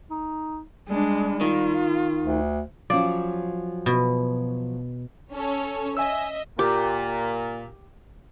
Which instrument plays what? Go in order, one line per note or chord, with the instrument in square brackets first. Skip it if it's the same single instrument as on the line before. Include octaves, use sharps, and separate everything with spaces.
[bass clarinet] D#4
[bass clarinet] G3 [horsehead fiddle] G#3 D4
[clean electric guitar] D#3 [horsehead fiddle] F4
[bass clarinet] D2
[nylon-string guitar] F3 F#3 C#4 [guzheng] D5
[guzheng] B2
[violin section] C#4 A4 C#5
[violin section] D#5 E5 [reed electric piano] G#5 E6
[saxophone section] A#2 [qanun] G4